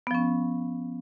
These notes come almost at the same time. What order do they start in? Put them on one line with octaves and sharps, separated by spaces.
B3 F3 C#4